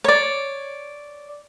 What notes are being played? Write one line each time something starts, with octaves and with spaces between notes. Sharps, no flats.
C#5 D5